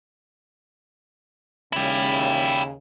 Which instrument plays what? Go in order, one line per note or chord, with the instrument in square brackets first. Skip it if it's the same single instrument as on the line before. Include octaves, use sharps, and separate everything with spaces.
[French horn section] D#2 C#3 [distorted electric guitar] E4 [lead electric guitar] G5 B5